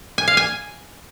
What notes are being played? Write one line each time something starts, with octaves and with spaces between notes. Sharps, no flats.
G#5
F5
G#5